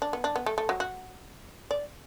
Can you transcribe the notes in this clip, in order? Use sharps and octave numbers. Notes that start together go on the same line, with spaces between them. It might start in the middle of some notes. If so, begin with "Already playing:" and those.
D4
B3
D4
B3
A3
A3
F#3
F#4
D5